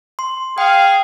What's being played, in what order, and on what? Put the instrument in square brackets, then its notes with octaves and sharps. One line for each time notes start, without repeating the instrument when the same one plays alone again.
[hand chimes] C6
[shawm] G#4 [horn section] F5 [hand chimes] G5